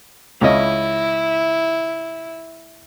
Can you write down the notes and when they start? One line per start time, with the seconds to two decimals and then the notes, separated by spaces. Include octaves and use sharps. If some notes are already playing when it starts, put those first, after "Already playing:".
0.41 C#2 C#4 E4 D#5